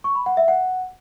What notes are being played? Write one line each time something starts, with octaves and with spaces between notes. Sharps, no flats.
C#6
B5
F#5
E5
F#5